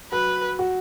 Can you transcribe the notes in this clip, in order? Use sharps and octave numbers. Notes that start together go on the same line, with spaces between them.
F#3 B4
F#4